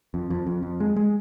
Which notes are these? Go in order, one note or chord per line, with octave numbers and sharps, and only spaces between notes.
F2
F2
F2
F2
G#3
G#3